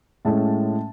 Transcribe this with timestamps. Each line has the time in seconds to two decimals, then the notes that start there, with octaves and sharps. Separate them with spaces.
0.25 A2 G#3 C#4 A5